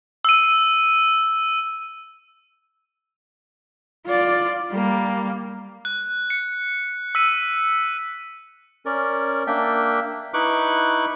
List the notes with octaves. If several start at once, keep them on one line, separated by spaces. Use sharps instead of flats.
E6 D#7
F4 D5
G3 A#3
F#6
C#7
E6 B6 D#7
C#4 A#4 D5
A#3 D4 E5 G5
D#4 E4 B4 C#6 D6 F#6